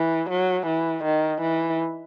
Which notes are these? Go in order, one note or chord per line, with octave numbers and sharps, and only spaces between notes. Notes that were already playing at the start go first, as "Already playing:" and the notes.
Already playing: E3
F#3
E3
D#3
E3